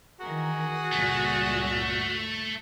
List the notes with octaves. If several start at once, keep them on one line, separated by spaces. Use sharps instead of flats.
D#3 E3 F#4 G#4 A#4
C#2 G2 A#2 A3